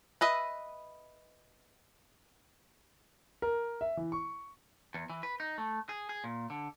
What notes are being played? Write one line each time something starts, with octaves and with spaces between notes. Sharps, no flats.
B4 D#5 E5
A#4
E5
E3
C#6
E2
E3
B4
D#4
A3
G#4
G#4
A#2
D3